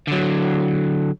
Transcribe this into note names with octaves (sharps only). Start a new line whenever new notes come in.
D3 F#3